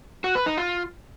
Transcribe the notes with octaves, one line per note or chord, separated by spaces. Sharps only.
F#4
B4
D#4
F4